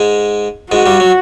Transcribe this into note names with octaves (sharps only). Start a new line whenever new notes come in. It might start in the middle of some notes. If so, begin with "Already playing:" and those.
Already playing: G#2 G#3
G#2 G#3 F#4
G2 G3
F#3